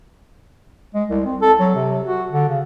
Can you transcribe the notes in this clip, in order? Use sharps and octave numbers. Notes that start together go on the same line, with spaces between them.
G#3
C2
C4
A4
F#3
C3
F#4
D3
C#3